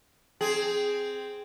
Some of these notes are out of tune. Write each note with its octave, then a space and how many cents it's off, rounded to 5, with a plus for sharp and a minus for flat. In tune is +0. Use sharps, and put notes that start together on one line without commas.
C4 -5 G#4 +0